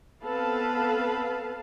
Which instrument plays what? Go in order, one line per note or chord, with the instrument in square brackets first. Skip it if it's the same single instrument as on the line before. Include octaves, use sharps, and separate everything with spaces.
[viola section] B3 C4 A4 B4 F5 A5